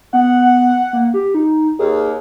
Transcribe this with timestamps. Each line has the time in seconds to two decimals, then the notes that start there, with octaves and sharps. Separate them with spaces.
0.13 B3 F#5
0.93 A#3
1.14 G4
1.35 D#4
1.79 D#2 G#4